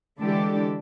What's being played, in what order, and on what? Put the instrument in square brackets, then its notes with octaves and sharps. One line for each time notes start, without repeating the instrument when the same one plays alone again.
[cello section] D3 E3 G#3 D4 G4 A4